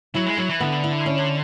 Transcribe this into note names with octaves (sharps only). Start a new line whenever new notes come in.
F#3 E4
G#3
F#3 E4
E3
D3 B3
E4
C#4